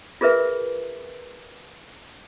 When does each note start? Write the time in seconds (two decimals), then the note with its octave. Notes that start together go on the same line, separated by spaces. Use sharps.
0.21 F4 G#4 A#4 B4 E5